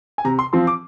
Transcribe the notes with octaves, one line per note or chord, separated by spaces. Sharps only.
G#5
C3 A#5
C6
F3 C4 C6
D6